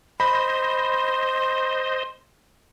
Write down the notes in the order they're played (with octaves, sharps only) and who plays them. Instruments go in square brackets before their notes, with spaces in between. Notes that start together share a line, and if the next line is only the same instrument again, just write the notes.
[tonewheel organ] C5 D#5 [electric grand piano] B5 [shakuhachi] C6